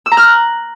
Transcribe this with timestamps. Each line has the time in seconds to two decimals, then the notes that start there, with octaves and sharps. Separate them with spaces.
0.06 E6
0.12 A#5
0.17 F6
0.23 F#6